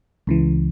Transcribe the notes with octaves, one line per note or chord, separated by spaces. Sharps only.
C#2 C#3 E3